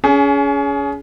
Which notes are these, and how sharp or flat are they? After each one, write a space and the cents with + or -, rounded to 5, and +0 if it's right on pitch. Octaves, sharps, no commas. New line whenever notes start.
C#4 +30 G#4 +10